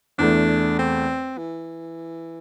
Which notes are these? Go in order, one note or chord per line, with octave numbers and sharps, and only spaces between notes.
E2 E3 A3 D4
C4
E3